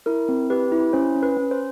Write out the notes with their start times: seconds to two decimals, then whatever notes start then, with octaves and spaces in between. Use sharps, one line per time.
0.06 E4 A#4
0.29 C4
0.50 G4 B4
0.72 E4
0.93 C#4 C5
1.15 C#4
1.23 B4
1.37 C#4
1.51 C5